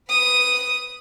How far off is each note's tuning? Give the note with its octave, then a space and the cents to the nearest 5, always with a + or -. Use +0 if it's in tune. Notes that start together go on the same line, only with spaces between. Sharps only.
B4 +5 D#6 +0